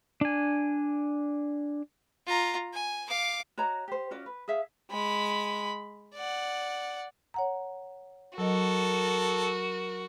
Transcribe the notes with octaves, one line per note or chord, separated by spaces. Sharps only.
D4 G#5
F4 A#5
G#5
F5 D6
F#4 C#5 D#5 A#5
G4 C5
C#4 F4 F#4 D5
B4
G#4 E5 F5
G#3 B5
D5 F#5
C#5 F#5 A#5
F#3 F#4 A4 A#4 D#5